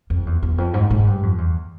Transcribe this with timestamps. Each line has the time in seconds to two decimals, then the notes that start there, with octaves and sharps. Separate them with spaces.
0.10 F2
0.26 E2
0.43 E2
0.58 F2
0.74 G#2
0.90 G#2
1.07 G2
1.23 F2
1.38 E2